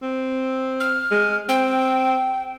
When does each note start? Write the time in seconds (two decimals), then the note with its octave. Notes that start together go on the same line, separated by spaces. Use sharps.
0.03 C4
0.80 F6
1.11 G#3
1.49 C4 G5